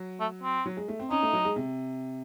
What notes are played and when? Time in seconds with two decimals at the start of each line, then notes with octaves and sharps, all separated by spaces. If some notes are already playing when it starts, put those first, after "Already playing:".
Already playing: F#3
0.20 A3
0.43 C4
0.66 F#3
0.77 G#3
0.88 A3
0.99 C4
1.11 C#4 D#4
1.23 A3
1.33 F#3
1.45 G#3
1.56 C3